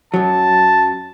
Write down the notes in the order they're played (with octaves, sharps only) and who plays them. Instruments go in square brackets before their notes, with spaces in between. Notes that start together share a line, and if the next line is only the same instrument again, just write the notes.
[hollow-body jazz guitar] F#2 F#3 [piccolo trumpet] A5